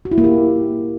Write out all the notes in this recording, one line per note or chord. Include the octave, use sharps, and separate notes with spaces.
F#4
E4
A#3
G4